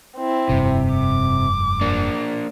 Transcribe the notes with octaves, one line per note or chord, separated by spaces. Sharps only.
C4 E4
F1 G2 C3
D6
A#3 D4